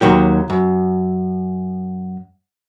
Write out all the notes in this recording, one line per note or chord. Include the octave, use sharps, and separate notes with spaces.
D#2 D#3 F#3 G4
F#2